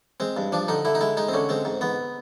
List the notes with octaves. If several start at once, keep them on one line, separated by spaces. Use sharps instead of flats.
G#3 C4
G2
F3 D4
D3 D#4
D3 E4
D#4
G#3 E4
G#3 D#4
C4
D3 C#4
G#3 C4
G#2
G#2 B3